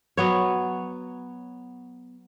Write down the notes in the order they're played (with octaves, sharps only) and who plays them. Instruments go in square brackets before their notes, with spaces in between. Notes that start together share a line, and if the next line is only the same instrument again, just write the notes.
[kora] F#3 B3 C#5